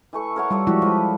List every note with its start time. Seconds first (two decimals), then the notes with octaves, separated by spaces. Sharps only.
0.13 E3 A3 C#6
0.36 A#4 C#5 F#5
0.51 G3 F4 A4 D5
0.67 F3 G#3 E4 F#4 G4
0.82 F3 G#3 D#5 B5